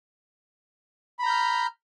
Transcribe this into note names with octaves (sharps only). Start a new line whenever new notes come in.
A#5 B5 F6 G6